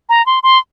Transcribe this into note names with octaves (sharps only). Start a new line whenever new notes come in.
A#5
C6
C6